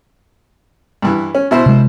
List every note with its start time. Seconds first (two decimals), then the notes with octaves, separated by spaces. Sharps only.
1.02 G2 E3
1.35 C#4
1.51 B2 E4 C5
1.66 C3 G#3